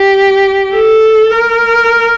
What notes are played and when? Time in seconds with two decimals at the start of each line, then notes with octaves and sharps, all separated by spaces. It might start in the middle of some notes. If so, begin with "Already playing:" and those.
Already playing: G4
0.73 A4
1.30 A#4